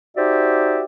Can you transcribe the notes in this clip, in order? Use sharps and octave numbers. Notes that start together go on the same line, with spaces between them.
D#4 F#4 G4 C5 D5 E5